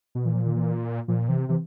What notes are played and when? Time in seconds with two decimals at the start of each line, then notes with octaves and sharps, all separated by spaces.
0.15 B2
0.25 A#2 E3
0.35 F3
0.45 D#3
0.56 E3
1.08 A#2 F3
1.28 C3 E3
1.49 C3 E3